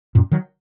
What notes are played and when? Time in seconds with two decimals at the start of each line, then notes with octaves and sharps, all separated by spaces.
0.15 F#2 A#2
0.32 D#3 F#3